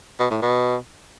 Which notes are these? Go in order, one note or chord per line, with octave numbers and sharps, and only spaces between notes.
B2
A2
B2